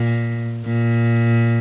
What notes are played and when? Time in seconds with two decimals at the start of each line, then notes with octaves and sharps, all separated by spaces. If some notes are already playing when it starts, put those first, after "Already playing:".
Already playing: A#2
0.66 A#2